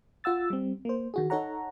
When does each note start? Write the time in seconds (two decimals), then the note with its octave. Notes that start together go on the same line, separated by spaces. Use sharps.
0.24 F4 F#5 E6 A6
0.50 G3 C4
0.85 A#3 C5
1.14 D#3 F#4 G#4
1.30 D#4 A4 C#5 F#5 A#5